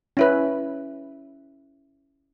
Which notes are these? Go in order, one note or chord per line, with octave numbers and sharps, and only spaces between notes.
C#4 E4 B4